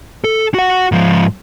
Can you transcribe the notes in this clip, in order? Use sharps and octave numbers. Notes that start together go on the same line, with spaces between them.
A4
F#4 F#5
G#2 F3